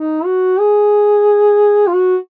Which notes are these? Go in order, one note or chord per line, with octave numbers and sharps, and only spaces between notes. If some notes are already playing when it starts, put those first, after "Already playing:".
Already playing: D#4
F#4
G#4
F4
F#4